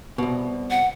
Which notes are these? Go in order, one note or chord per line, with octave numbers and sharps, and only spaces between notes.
C2 B2
F#5